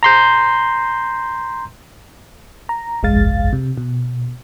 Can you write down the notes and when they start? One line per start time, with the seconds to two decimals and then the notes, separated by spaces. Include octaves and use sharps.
0.03 A#5 C6 G6
2.69 A#5
3.03 G1 C2 F2 G#3 F5 A6
3.53 C3
3.78 B2